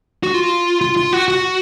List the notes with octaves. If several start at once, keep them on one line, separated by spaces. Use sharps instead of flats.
F#4
F4
F4
F4
F#4
F#4